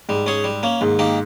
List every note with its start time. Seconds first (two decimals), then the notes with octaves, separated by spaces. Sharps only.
0.09 G#2 G3
0.27 C#4 G#4 C#5
0.44 G3
0.63 A#3 C#4
0.81 D#2 G#2
0.99 D#3 A#3 D#4 G4